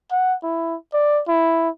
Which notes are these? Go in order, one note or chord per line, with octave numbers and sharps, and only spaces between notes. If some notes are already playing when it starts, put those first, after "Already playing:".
F#5
E4
D5
E4